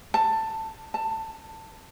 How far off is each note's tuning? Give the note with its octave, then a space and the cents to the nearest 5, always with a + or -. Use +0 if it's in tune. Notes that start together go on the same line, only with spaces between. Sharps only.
A5 +10
A5 +15